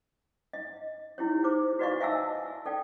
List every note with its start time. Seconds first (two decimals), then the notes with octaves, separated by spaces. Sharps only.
0.53 D#5
1.18 D#4 E4 G4 C#5
1.43 D#4 G#4 C5 D6
1.79 F#4 B4 D5 D#5 F5 C#6
2.00 D#5 E5 G#5 A5 E6
2.66 A4 D5 G5